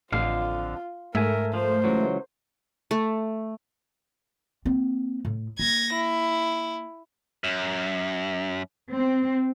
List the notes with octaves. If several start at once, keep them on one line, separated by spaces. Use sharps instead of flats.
A1 F2 D3 F4 F5
G#2 A3 A#4 E5 G#5
F3 C5
C#2 E3 F#3
A3
A#3 C4
A2
A#3 G#6 A#6
E4
F#2
C4